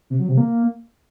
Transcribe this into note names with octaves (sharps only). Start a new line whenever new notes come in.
C3
F#3
C3
A#3